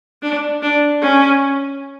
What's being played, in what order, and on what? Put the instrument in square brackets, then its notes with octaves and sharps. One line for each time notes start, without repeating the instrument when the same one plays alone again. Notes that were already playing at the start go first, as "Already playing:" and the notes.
[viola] D4
D4
C#4